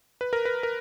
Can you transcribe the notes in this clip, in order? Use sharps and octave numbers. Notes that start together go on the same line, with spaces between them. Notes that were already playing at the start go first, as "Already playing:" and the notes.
B4
A#4
B4
A#4